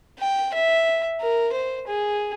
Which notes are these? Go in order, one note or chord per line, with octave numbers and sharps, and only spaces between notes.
G5
E5
A#4
C5
G#4